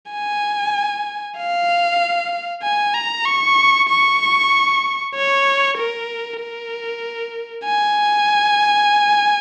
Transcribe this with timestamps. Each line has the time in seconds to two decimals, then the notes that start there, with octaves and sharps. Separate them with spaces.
0.11 G#5
1.38 F5
2.63 G#5
2.94 A#5
3.25 C#6
3.89 C#6
5.15 C#5
5.77 A#4
6.40 A#4
7.65 G#5